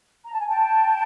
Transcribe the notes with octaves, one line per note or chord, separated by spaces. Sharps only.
A#5
A5
G#5
G5 A5